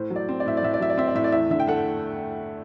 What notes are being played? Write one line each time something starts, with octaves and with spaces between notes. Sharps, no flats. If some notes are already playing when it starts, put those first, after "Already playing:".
Already playing: A2 C5
F#3
D5
C4
D5
A2 E5
D5
A2 E5
D5
F#3 E5
D5
C4 E5
D5
A2 E5
D5
E2 E5
D3 E5
G5
A3 F#5